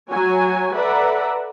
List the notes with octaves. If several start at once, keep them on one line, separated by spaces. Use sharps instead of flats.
F#3 F#4 C#5 G#5
A4 B4 D5 E5 F#5 A#5